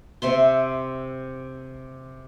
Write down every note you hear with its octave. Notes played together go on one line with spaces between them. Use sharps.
C3 E5 C6